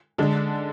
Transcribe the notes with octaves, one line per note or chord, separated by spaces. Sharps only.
D3 G#3 D4